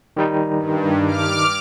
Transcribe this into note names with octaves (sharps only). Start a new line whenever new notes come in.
D#3 G3 D#4
G2
D6 F6